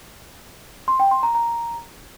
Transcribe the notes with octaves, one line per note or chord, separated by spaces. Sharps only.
C6
G5
C6
A#5
A#5